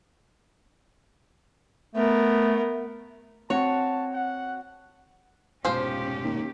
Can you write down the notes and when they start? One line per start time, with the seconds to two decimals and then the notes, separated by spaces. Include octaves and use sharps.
1.95 A3 B3 A#4
3.50 C4 F#4 C#5 A5
4.14 F#5
5.65 F1 G#2 B2 F3 C#4 F4 G4 C5
6.23 D#2